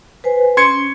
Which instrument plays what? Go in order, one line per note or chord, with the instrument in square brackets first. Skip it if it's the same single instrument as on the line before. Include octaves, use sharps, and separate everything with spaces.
[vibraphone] B4 C5 G#5
[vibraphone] C#4 [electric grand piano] C6 G#6 C#7